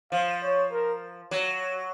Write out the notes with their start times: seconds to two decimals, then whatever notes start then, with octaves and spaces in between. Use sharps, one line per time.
0.12 F3 F5
0.42 C#5
0.72 A#4
1.31 F#3